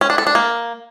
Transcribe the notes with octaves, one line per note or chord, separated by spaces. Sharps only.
C#4
D4
A4
D4
A#3